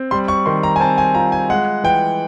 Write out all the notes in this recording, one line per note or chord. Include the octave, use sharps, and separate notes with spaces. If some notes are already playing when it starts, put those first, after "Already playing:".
Already playing: C4
G3 C6
C#6
D#3 C6
A#5
G#5
C4 A5
G#5
F4 A#5
G#5
G#3 F#5
E3 G5